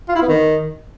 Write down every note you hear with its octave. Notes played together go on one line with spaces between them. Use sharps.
F4
E4
B3
D#3